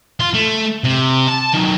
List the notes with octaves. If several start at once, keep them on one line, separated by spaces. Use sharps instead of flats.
F4
A3
C3
A5
D#3 F#3